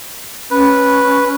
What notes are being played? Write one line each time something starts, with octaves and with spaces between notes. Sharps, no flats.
C#4 B4